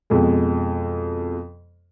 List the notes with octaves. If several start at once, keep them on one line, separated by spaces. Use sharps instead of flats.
F2 B2 G#3